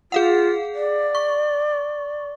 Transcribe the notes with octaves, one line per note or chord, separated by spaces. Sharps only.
F4 G#4 F5 F#5
D5
C#6